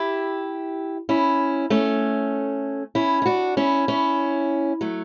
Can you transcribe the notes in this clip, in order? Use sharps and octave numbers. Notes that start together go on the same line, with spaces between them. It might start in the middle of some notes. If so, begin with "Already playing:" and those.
Already playing: E4 G4
C#4 E4
A3 C#4
C#4 E4
E4
D4 F#4
C#4 E4
C#4 E4
F#3 A3